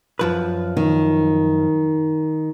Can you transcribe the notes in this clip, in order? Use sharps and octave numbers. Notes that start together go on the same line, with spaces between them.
F#2 F3 B4
D#3